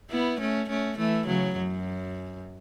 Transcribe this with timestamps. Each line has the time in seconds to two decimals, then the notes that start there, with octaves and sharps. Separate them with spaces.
0.10 B3 E4
0.40 A3 C#4
0.69 A3 C#4
0.98 E3 A3
1.27 C#3 F#3
1.57 F#2